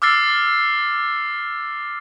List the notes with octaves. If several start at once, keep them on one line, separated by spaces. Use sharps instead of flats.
D6 E6 F6 A6 C7